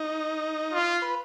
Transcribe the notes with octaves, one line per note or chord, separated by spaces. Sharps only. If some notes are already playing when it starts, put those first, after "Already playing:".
Already playing: D#4
F4
B4